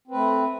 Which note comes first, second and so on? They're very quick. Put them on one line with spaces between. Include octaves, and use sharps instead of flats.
C4 B4 A3